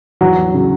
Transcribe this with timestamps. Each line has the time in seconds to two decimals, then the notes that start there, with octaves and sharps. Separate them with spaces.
0.21 E2 F#3 F#4
0.54 C#3 F#3